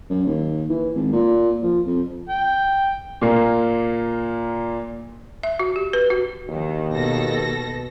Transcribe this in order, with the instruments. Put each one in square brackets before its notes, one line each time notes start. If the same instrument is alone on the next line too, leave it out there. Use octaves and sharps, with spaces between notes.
[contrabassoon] F#2
D#2
E3
G#1
A#2
F3
F2
[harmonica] G5
[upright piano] A#2 A#3
[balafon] E5
F#4
G4
B4
F#4
[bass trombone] D#2 [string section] D#3
[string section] B2 A4 A#6